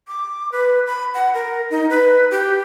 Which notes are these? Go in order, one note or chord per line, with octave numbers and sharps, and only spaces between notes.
D6
B4
B5
F#5
A#4
D#4
B4
G4